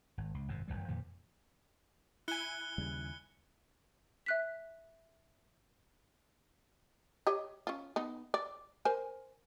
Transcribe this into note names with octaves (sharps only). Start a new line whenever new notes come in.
G#1
C#2
G#1 F#2 C3
F#1 B1 E3 G3
F2 A#2 D#3 E3
E4 G#5 F#6 C#7 G7
D#2 C#3 G3
E5 F#6 B6
G4 C#5 D#5
C#4 F4
B3 D#4
D5
A#4 C5 G#5